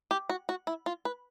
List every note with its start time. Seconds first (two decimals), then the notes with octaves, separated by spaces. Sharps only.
0.11 G4
0.29 F#4
0.49 F#4
0.67 E4
0.86 F4
1.05 B4